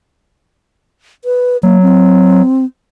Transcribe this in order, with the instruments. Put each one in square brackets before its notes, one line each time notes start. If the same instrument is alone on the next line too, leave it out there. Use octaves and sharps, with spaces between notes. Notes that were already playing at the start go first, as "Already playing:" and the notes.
[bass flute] B4
[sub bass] F#3 [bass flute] A#3
[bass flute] C4